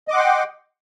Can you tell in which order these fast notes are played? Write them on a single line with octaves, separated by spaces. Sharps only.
D#5 D6 F#5 C6 G5